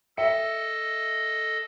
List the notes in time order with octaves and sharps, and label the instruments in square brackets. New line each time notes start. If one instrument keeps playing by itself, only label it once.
[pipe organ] A4 D#5 [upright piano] E5 C#7